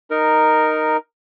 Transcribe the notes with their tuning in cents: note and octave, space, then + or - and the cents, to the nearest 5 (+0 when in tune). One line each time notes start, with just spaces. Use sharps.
D#4 -5 A#4 +0